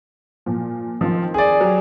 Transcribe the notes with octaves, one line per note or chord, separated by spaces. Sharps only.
A#2 F3
D#3 F3 C4 F4
G#4 D5
F#3 G4